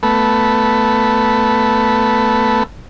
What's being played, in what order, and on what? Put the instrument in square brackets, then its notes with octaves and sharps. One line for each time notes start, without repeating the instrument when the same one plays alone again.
[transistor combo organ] A3 B3